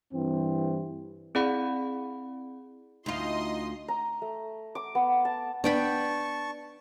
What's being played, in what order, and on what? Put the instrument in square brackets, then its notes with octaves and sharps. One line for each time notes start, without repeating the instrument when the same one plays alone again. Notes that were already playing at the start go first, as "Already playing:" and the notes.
[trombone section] G2 E3 C4
[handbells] C4 E4 G#4 D5 F#5 B5
[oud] D2 F4 [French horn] D#4 [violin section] D#5 C6
[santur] A#5
A3
D6
B3
A5
[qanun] B3 G5 B5 [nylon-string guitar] D4 [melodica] A5 C#6